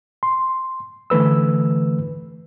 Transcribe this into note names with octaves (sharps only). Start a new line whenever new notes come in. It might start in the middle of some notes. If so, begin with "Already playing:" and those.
C6
D3 E3 A3 B4 E6